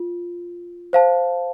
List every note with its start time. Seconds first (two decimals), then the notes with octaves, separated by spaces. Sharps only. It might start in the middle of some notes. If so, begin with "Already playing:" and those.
Already playing: F4
0.93 C5 F5 A5